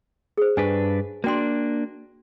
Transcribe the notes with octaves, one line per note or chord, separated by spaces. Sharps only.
G#4 C5
G2 D4 B4 G#5 C#6
A#3 D4 F#4 G5 C6